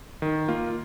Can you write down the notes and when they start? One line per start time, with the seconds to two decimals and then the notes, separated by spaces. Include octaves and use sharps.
0.22 D#3
0.48 A#3 F4